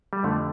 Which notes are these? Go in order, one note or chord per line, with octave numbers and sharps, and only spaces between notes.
G3
F2 D3 F3 A3